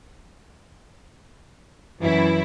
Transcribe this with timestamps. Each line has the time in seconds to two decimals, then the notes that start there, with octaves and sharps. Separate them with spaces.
2.01 F#2 E3 E4